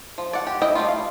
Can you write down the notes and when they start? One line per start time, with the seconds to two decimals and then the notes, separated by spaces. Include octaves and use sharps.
0.18 F3
0.33 D5 F#5
0.47 G4
0.62 E4 D#5 G5
0.75 G3 A3 C#4 F4
0.88 F5